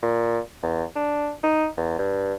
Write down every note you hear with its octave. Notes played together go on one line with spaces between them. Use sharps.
A#2
E2
D4
D#4
E2
G2